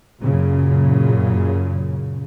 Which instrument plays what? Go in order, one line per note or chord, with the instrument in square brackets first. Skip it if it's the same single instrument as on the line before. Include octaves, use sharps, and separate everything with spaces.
[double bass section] F#2 A#2 C#3